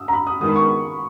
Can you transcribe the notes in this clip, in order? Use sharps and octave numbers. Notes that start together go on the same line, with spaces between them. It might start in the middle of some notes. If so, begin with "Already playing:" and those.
Already playing: D#6 E6
A#5
B5
D#6
D#3 G#3 B3 D#6
B5
C#6